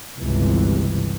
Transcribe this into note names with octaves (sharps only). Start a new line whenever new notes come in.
G1 C#2 C3 E3